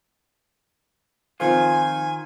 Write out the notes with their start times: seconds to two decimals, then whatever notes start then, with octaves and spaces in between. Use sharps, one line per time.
1.40 D#3 F3 C4 F4 G#5